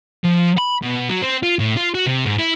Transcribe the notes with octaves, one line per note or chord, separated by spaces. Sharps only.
F3
B5
B2
F#3
C4
F4
A2
F4
F#4
C3
G#2
E4